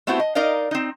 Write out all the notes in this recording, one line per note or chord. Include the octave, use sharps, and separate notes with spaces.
A3 B3 C4 E4 F#4 G4
D#5
D#4 A#4 D5 D#5 F5
C4 D#4